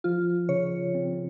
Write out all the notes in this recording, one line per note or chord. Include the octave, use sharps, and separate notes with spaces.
F3 F4
C#3 C#5
C4